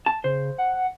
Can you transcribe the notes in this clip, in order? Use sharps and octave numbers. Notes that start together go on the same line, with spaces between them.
A5
C#3 C5
F#5